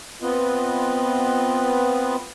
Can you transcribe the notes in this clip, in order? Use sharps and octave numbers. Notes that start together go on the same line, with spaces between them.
B3 C4 F4 B4 D#5